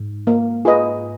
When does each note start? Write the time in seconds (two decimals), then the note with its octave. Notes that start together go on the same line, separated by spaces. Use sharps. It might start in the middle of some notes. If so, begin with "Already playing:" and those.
Already playing: G#2
0.27 A#3
0.65 F4 G#4 B4 D#5